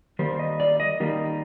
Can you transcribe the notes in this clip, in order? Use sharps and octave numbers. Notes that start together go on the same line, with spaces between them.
D#3 G3 A#3 C5
D#5
D5
D#5
D#3 G3 A#3